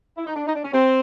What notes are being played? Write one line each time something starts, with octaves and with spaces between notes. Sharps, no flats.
E4
D#4
D4
D#4
D4
C#4
C4